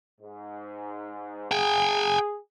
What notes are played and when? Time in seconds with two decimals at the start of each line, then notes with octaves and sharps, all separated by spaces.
0.21 G#2
1.51 G#4 G5 G#5